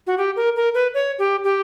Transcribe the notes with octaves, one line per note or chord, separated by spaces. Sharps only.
F#4
G4
A#4
A#4
B4
C#5
G4
G4